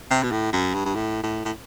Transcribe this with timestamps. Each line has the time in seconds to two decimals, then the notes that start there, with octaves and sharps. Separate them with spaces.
0.11 C3
0.23 B2
0.32 A2
0.53 F#2
0.74 G2
0.85 G2
0.95 A2
1.23 A2
1.45 A2